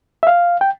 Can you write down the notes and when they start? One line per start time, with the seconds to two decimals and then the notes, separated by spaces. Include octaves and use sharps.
0.23 E5
0.27 F5
0.61 G5